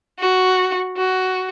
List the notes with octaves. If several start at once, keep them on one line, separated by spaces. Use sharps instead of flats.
F#4
F#4